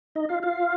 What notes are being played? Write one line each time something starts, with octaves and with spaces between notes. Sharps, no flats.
D#4 D#5
F4 F5
F4 F5